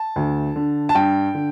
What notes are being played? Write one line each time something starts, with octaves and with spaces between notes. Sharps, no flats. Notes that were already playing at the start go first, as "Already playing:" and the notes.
Already playing: A5
D2
D3
A5
G2 G5
D3